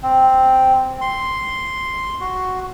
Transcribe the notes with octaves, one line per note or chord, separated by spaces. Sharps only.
C4
C6
F#4